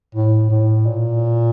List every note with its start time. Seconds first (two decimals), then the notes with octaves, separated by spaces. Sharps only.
0.15 A2
0.50 A2
0.86 A#2